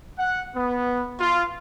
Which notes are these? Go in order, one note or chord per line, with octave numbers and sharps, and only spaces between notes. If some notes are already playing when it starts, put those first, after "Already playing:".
F#5
B3
F4